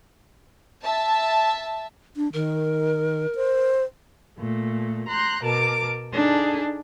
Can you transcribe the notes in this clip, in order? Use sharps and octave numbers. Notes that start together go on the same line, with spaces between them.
E5 A5
D4
D#3 A#4
C5
A#2 A3
A#5 C6 F#6 G6
B2 A#4 A5 D6
D4 D#4 G#4 A4